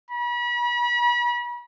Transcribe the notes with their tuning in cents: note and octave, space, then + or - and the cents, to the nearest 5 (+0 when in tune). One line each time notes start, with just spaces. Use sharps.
B5 -40